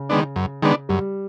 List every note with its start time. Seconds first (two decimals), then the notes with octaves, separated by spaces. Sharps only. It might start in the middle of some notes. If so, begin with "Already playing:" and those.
Already playing: C#3
0.09 D#3 G#3 B3 D4
0.36 F#2
0.62 D#3 G#3 B3 D4
0.89 F#2 G3